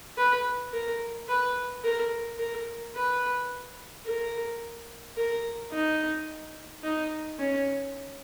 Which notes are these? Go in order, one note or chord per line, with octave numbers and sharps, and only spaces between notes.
B4
A#4
B4
A#4
A#4
B4
A#4
A#4
D#4
D#4
C#4